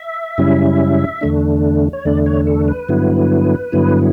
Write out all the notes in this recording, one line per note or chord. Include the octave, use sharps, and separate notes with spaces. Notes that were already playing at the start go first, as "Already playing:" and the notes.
Already playing: E5
F#2 C#3 G3 C#4 E4
E2 D3 A3 D4
C#5
E2 D3 A3 D4 D5
C#5
A4
B4
G2 D3 F#3 B3 E4
G2 D3 F#3 B3 E4